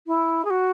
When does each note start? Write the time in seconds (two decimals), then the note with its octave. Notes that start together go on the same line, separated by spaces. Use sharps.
0.07 E4
0.45 G#4
0.50 F#4